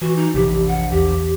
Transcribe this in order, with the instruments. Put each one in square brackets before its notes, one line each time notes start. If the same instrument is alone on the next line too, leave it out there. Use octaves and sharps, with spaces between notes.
[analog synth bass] E3 [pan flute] F#4
[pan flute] D#4
[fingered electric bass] F1 C3 E3 [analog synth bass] A#1 [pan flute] G4
[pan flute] F#5
[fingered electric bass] E2 [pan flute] G4